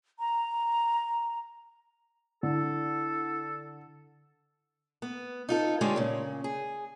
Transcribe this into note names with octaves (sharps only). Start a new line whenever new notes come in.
A#5
D3 E4 A4
B3
D#4 F4 A4
D3 G#3 F4 G4 C#5
A#2 C#3
G#4